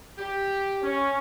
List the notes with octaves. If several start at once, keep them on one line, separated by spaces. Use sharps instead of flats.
G4
C#4